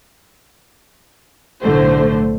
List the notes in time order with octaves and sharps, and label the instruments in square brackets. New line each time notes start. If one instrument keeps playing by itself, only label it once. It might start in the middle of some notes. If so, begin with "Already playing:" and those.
[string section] B1 A2 D3 A3 C5